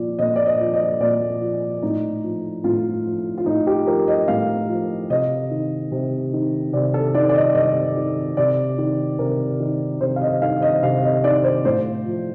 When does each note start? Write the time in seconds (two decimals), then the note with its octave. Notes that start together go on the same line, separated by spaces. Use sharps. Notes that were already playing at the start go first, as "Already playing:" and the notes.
Already playing: A#2 F3 D5
0.19 A#2 D#5
0.36 D5
0.46 D#5
0.60 F3
0.74 D#5
1.00 A#2 D5
1.41 F3
1.82 A2 D#4
2.23 F3
2.64 A2 F4
3.05 F3
3.38 F4
3.46 A2 D#4
3.67 G4
3.87 F3 A#4
4.08 D#5
4.28 A2 F5
4.69 F3
5.10 C3 D#5
5.51 D#3
5.92 C3
6.33 D#3
6.73 C3 D5
6.94 A4
7.14 D#3 D5
7.29 D5
7.35 D#5
7.55 C3 D#5
7.97 D#3
8.37 C3 D5
8.78 D#3
9.19 C3 A#4
9.60 D#3
10.01 C3 C5
10.16 F5
10.21 D#5
10.42 D#3 F5
10.62 D#5
10.83 C3 F5
11.03 D#5
11.24 D#3 D5
11.44 C5
11.64 A2 C5
12.06 F3